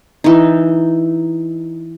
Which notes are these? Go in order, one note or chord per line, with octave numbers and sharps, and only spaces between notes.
E3 D#4